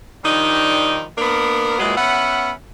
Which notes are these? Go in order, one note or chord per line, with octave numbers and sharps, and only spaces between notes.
D#3 F3 G3 D4 D#4
A#3 B3 D4 A#4
A#2 E3 F#3 G#3
B3 C#4 E5 F#5